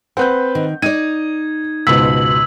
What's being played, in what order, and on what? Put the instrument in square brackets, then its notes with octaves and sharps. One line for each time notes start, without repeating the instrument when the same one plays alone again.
[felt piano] C4 B4 G6 [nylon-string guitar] F#5
[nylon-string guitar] D#3
[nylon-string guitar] D#4 D5 [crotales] G#6 [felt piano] D#7
[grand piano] C#2 G#2 B2 [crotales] E6 F#7 [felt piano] B6